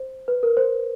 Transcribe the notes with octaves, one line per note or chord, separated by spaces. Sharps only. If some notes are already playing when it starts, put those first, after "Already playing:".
Already playing: C5
B4
A#4
C5